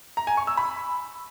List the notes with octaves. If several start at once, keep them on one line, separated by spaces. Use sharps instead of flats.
A#5
G#5
C#6
E6
B5